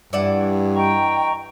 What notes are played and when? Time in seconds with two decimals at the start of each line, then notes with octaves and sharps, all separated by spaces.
0.13 G2 E3 D5 F#5
0.76 D#5 G5 A#5 C#6